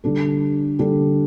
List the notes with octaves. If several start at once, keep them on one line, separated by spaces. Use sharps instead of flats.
D3 G3 D4 A4
D3 G3 D4 A4